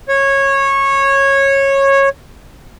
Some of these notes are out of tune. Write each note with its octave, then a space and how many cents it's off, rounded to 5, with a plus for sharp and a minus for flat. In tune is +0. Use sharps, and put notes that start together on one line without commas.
C#5 -15